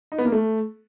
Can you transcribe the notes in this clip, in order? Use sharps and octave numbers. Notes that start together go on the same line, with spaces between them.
D#4
B3
A#3
A3